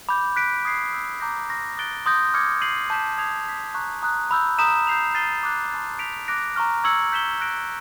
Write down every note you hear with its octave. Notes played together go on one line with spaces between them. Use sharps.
B5 D6 G6
F#6 B6 D7
D#6 G#6 C7
E6 G6 C7
A#5 D6 G6 A#6
C#6 F6 A#6
D#6 F#6 A6 D7 G7
C6 D#6 G6 A#6
D6 F6 G#6 C#7
G6 C7 D#7 F#7
A5 D6 G6 B6 E7
D#6 G#6 C7 F7
D#6 G#6 B6
A#5 C#6 F#6
A#5 D#6 F#6
B5 E6 G6
A#5 D#6 G6 B6 E7
G6 C7 F7
F6 A6 C7 D#7 G7
D6 F#6 A6
A5 C6 F6 A6
G6 B6 D7 F7
D6 F#6 A#6 D7
A#5 C#6 F6
C#6 E6 G#6 C#7 F#7
G6 B6 E7 G7
F#6 A#6 D7